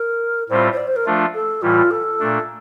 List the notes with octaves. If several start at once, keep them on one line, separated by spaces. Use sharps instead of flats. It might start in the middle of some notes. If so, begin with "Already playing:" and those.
Already playing: A#4
A2 G3 C4 F4 C5
C5
D5
C5
A#4
F3 A3 D4 F4
A4
A2 E3 G3 F4
A4
A#2 A3 D4